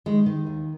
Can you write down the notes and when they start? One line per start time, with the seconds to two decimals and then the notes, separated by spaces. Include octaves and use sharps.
0.06 D#3 G#3
0.26 D#3
0.47 D#2